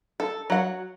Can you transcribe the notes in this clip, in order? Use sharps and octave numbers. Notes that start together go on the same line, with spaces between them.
A4
F#3 F#5